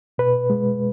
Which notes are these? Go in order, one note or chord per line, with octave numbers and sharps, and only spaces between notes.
B2 B4
G#3